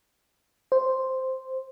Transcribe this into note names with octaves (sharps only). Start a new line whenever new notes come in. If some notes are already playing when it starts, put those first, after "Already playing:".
C5